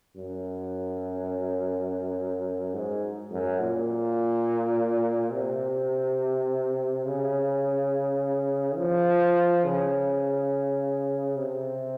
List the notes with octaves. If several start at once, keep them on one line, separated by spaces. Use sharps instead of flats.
F#2
G#2
F#2
A#2
C3
C#3
F3
C#3
C3